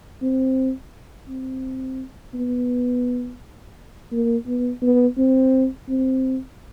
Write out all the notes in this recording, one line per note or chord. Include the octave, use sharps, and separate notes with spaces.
C4
C4
B3
A#3
B3
B3
C4
C4